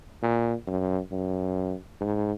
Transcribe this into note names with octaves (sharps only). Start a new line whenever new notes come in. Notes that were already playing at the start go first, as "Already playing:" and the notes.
A#2
F#2
F#2
G#2